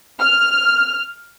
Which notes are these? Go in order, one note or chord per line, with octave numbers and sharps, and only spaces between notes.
F6